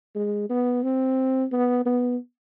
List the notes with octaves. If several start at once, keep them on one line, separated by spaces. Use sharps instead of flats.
G#3
B3
C4
B3
B3